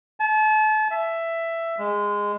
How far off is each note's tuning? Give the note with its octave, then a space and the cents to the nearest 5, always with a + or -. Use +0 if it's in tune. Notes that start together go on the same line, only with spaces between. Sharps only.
A5 -35
E5 +10
G#3 -15